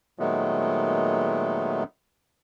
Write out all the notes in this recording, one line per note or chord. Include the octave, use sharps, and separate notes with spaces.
A#2 D#3 F#3 G#3 A3 B3